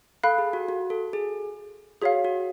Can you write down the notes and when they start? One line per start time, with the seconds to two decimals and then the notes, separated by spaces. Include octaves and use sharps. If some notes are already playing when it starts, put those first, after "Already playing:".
0.24 A4 F5 B5 F#6
0.38 G#4
0.53 F#4
0.69 F#4
0.90 A4
1.13 G#4
2.02 F#4 G#4 C#5 F5
2.24 F#4